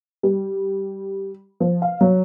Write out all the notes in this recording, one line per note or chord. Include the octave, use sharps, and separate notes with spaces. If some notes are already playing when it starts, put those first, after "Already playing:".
G3
F3
F5
F#3